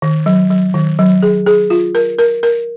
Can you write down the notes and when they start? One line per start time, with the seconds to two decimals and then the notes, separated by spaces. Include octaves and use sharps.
0.02 D#3
0.26 F#3
0.51 F#3
0.74 D#3
0.99 F#3
1.22 G#4
1.47 G#4
1.70 F4
1.95 A#4
2.19 A#4
2.43 A#4